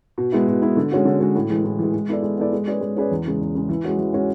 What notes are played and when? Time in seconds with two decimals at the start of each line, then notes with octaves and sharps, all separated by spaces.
0.18 B2
0.32 G#3 B3 E4
0.48 B2
0.62 G#3 B3 E4
0.77 D3
0.92 G#3 C#4 F#4
1.05 D3
1.20 G#3 C#4 F#4
1.35 A2
1.50 E3 G#3
1.65 A2
1.79 E3 G#3
1.94 G#3
2.09 B3 E4 A4 D5
2.22 G#3
2.38 B3 E4 A4 D5
2.53 G#3
2.67 C#4 G#4 B4 D5
2.81 G#3
2.97 C#4 G#4 B4 D5
3.11 E2
3.26 C#3 G#3
3.40 E2
3.55 C#3 G#3
3.69 E3
3.84 G#3 C#4 F#4
3.98 E3
4.13 G#3 C#4 F#4